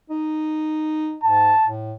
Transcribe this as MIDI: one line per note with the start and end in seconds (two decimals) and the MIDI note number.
0.10 1.15 63
1.23 1.52 44
1.23 1.70 81
1.66 1.93 45